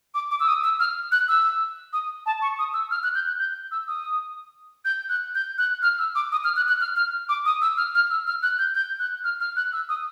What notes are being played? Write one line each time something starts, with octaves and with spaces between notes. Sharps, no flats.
D6
D6
E6
D#6
E6
F6
F#6
E6
D#6
A5
C#6
D#6
E6
F6
F#6
G6
F#6
G6
E6
D#6
G6
F#6
G6
F#6
F6
E6
D6
D#6
F6
F#6
F#6
F6
F6
D6
D#6
E6
F6
F6
E6
F6
F#6
G6
G6
F#6
F6
F6
F#6
E6
D#6